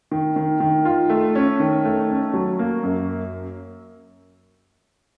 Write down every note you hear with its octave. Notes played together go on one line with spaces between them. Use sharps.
D#3
D#3
D#3
F4
A3
C#4
D#3
A3
C#4
F#3
A#3
F#2